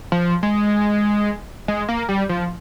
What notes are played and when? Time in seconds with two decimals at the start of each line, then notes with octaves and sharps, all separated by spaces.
0.12 F3
0.43 G#3
1.68 G#3
1.89 A#3
2.09 G3
2.29 F3